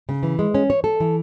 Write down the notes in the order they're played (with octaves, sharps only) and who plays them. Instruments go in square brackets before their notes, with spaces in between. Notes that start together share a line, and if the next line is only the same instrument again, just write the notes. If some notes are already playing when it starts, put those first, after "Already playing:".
[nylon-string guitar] C#3
E3
G#3
C#4
C#5
A4
E3